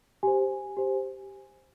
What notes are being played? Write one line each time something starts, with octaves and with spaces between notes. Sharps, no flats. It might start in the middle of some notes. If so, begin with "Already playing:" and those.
G4 C5 G#5
G4 C5